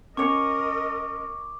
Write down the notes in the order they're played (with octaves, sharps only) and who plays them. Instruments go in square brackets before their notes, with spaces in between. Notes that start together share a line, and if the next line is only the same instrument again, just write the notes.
[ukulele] C#4 C#5 [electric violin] A#4 D#5 [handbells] C#6 C#7 [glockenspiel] D6